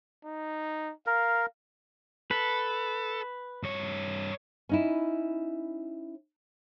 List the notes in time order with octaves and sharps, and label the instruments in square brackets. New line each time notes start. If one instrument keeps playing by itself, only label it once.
[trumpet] D#4
[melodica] A#4 [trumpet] F5
[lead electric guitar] A4 [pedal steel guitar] B4
[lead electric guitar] G2 C#5
[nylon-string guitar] C#4 D#4 E4